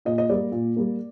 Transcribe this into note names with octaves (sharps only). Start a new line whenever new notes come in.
A#2 D#5
D#5
G3 A#3 D5
A#2
G3 A#3